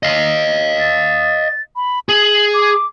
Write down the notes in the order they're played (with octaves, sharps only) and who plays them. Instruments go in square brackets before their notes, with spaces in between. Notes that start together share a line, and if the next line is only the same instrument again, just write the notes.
[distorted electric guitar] D#5 F5
[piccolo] A6
B5
[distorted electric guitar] G#4 [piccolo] F#7
[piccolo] D6